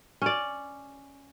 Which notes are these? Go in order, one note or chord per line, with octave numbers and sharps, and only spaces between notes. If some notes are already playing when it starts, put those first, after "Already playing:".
C#4 D5